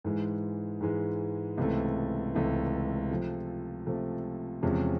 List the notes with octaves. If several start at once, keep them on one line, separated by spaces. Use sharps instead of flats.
G#2 E3 G#3
G#2 E3 G#3
C#2 C3 E3 A3
C#2 C3 E3 A3
C3 F3 A3
C3 F3 A3
E2 C3 F3 G#3 C#4